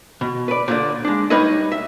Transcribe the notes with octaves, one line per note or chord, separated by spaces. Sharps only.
B2
B4 D5
A#2 D3 D5
G#3 D4
G3 D#4 B4 C#5 D#5
E5